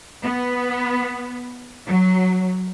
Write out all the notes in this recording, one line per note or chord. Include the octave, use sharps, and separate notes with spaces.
B3
F#3